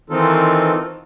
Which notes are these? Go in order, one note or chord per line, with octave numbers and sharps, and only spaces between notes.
D#3 E3 C4 D#4 F4 A4